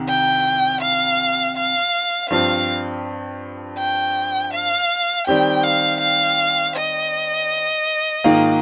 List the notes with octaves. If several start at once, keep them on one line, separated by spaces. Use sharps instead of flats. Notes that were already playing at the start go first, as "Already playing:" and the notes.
Already playing: C2 C3 D#3
G5
F5
F5
G2 F3 C4 F4 F5
G5
F5
D#3 G3 C4 G4 G5
F5
F5
D#5
G#2 D#3 A#3 F4